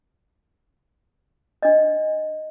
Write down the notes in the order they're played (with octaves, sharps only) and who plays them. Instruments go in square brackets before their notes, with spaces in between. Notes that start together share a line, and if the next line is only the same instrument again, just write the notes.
[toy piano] D4 D#5